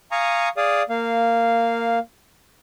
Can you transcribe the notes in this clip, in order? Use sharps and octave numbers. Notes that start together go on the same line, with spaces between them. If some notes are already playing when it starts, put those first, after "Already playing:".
F5 G#5 A#5 C#6 D#6
G#4 D5 F5 D#6
A#3 F5